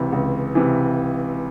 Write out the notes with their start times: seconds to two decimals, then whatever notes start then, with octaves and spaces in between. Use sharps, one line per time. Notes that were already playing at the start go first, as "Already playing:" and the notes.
Already playing: C#2 C3 E3
0.12 C#2
0.55 C3 E3